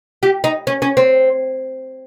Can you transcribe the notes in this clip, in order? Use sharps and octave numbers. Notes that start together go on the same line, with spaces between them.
G4
D#4
C#4
C#4
C4